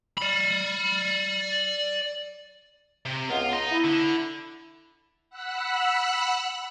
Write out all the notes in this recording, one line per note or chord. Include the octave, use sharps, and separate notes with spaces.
D5 B5
C3
C#2 B3 F4
D#5 A#5
E4
D3
F#5 B5 E6 F#6